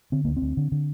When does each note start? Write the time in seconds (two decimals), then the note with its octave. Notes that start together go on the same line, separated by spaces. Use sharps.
0.12 D3 C4
0.25 D2 A#3
0.37 C4
0.42 D2
0.57 D3
0.72 D3